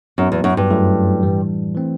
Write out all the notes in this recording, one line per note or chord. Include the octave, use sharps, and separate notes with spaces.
F#2 F#3 B3 F#4
E2
F#2
G2
F#2 F#3 A3 E4 A4
A2 E3 G3
E3 A3 C4